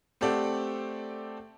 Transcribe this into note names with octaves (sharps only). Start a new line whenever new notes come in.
A3 C4 G4 A4 D5 F#5